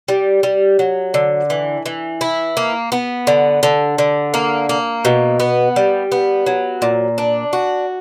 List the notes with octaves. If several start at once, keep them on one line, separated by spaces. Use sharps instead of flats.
G3
G3
F#3
D3
E3
E3
E4
A#3
B3
D3
D3
D3
A#3
A#3
B2
B3
G3
B3
F#3
A#2
D4
F#4